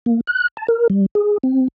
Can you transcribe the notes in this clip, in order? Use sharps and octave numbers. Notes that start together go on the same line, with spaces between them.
A#3
F#6
A5
A#4
G3
G#4
C4